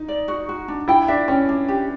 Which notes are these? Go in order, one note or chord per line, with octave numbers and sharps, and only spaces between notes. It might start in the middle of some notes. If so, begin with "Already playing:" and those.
Already playing: D#4
D5
F#4
F#4
D4
E4 G5
D4 E5
C#4 G5
D4
G4